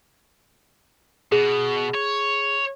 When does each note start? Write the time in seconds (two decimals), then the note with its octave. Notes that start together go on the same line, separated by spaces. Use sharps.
1.32 B2 G#4
1.95 C#5